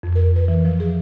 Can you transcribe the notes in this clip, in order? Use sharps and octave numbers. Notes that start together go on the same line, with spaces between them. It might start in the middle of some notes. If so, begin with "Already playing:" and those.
F2
A#4
B4
E3
F3
G#4